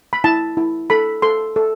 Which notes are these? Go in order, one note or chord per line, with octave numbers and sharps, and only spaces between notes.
B5
E4 A5
E4
A4 B5
A4 C6
A4